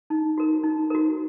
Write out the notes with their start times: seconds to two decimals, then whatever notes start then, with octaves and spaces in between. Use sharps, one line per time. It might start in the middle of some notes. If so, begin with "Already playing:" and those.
0.10 D#4
0.38 F#4 A#4
0.64 D#4
0.90 F#4 A#4